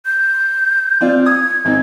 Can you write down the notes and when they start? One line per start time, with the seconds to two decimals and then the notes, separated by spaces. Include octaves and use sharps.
0.06 G6
1.01 C4 F4 D5
1.26 D#6 G#6
1.65 G#1 C4 D#4